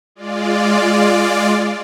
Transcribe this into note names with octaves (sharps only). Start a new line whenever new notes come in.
G#3 F4 D5